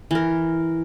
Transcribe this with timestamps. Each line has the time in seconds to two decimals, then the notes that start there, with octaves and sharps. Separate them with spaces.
0.11 E3 A#4